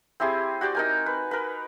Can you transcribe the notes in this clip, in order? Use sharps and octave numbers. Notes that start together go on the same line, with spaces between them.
C4 E4 G4 G#4
F#4 G4 D5 G5
D#4 A#4 G#5
B4
A#4 B4